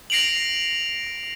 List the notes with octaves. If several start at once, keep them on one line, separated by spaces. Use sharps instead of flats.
A#6 C7 D7 F7 F#7